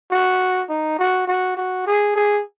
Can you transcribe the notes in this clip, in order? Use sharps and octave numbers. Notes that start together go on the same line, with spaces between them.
F#4
D#4
F#4
F#4
F#4
G#4
G#4